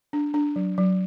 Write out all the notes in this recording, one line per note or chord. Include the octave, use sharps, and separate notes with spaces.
D4
D4
F#3
F#3